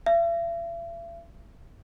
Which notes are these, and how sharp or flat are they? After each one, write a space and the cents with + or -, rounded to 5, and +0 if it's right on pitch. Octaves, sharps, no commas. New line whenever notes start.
E5 +45